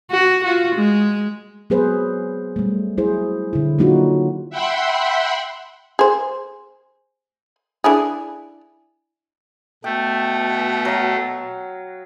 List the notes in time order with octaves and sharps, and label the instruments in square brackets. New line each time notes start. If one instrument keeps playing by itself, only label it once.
[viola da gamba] F#4
F4 F#4
G#3
[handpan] F#3 B3 G#4 B4 C5
G3 A3
F#3 E4 G#4 C5
D3 E4
F#3 A#3 D4 D#4 F4 F#4
[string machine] E5 F#5 G5 B5 C6
[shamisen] G#4 C5
D4 E4 G#4
[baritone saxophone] B2 [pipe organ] A3 [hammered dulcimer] G5
[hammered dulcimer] F#3 F5